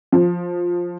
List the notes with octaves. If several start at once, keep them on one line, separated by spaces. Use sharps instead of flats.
F3